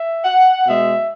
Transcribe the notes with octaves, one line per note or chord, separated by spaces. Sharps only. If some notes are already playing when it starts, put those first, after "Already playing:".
Already playing: E5
F#5
B2 G#3 E5